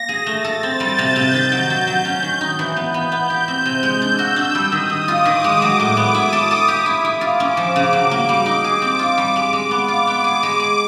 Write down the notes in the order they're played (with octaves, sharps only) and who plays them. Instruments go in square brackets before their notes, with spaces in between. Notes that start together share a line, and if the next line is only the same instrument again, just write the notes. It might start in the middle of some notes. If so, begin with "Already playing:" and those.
Already playing: [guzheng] A#3 [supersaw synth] A#6
[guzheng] G#4
[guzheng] A3 [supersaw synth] A6
[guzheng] A4
C4
[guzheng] G3 [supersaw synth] G6
[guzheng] C3
C3
D#3
F#3
F#3
F#3
C#4
D#3
D#4
E3
B3
[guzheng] B3 [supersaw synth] G6
[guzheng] B3
G4
C4
C3
G#3
[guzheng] D4 [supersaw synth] E6
[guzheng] F#4
D4
[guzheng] G3 [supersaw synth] D#6
[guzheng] D#3
D#3
[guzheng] F4 [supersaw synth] D6
[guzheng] D#3
G#3
F#3
A2
B3
[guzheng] E4 [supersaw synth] D#6
[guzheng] A4
A4
G4
E4
E4
[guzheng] F4 [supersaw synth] D6
[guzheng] C#4
F3
C#3
F#3
A#3
[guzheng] G3 [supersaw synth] D6
[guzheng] D#4
G#4
C4
F4
G3
G#3
G#3
B3
[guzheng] F4 [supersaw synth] D6
[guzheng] B3
G#4
G#3
G#4